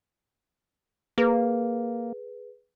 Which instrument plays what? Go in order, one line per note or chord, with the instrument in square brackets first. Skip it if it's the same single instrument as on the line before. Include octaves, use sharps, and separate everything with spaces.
[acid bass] A#3 [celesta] G#4 B4